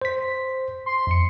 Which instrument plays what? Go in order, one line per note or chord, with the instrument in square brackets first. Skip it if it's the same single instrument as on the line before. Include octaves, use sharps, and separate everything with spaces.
[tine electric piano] C5 B6
[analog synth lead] C6
[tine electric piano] F2 C#7